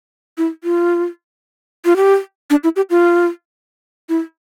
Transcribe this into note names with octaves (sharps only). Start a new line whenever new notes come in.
E4
F4
F4
G4
D4
E4
G4
F4
E4